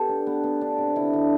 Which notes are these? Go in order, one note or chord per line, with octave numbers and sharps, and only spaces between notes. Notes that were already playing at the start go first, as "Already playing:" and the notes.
Already playing: B3 G4 A4
D4
B3
B3
D4
C3
D3 E4
D3